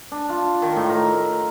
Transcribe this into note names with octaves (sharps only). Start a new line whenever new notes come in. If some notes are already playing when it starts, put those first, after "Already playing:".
D4
F4
D#3
A2
A#4